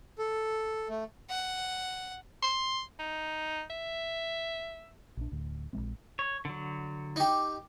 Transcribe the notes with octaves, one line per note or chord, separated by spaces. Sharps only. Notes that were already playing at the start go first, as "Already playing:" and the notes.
A4
A3
F#5
C6
D#4
E5
A#1 D4
D1 D2
A#1 E2 G#3 C4
C#5
D3 F#3
D#4 G4